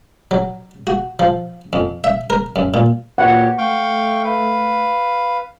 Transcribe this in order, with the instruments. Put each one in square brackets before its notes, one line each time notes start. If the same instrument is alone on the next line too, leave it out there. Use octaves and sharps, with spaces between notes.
[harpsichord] F#3
F#4
F3
F2
E5
A#4
F#2
A#2
[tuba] A#2 [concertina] F#4 G4 C#5 [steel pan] F#5
[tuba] A3 [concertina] F5 G5 C#6
[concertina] B4 F5